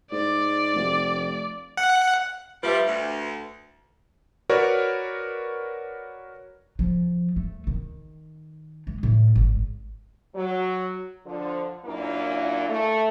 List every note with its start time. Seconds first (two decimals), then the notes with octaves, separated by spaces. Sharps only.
0.12 G#2 D5
0.76 F1
1.77 F#5
2.63 F3 G3 B4 E5
2.86 D2
4.49 F#4 A#4 B4 C#5 D5
6.79 F3
7.36 A3
7.67 D#3
8.87 G#3
9.03 A2
9.35 G#1
10.36 F#3
11.27 D3 F3
11.85 F#2 A#2 A#3 D4 E4
12.69 A3